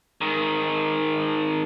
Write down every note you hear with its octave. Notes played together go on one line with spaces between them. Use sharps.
G#2 D#3